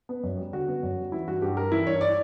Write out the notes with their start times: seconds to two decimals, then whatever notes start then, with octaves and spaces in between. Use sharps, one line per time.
0.09 B3
0.23 F#2
0.38 G3
0.53 D3 F#4
0.68 B3
0.83 F#2
0.97 G3
1.12 E3 E4
1.27 G2 F#4
1.42 G2 G4
1.57 G3 A#4
1.72 E3 E4
1.86 G2 C#5
2.01 D5